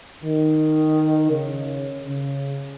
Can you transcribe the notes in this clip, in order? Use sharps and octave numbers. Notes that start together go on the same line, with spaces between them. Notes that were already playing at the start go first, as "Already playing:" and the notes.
D#3
C#3
C#3